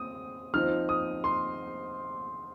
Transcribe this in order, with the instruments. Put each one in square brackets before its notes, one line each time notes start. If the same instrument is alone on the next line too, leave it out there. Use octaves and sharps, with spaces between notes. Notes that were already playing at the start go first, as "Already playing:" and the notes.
Already playing: [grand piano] C4 D#6
F3 C4 D#4 F6
D#6
C6